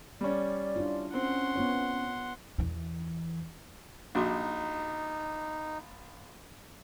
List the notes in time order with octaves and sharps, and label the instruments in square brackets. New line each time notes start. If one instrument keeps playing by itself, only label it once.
[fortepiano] G3 C#4 [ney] D5
[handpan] D4 E4 F4
[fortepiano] C4 [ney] C#4 [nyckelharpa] F#5 C6
[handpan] B3 F4 C#5
[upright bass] E2 E3
[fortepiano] A#1 [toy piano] D4 F#4 D6 [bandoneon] D#4